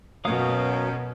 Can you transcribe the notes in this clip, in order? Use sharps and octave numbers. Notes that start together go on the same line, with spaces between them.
F#2 B2 F#3 C#4 F5 D#6